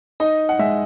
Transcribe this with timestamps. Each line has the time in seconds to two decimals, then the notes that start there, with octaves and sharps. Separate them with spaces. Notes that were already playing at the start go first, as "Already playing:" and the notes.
0.20 D#4 D#5
0.49 F#5
0.59 G#3 E5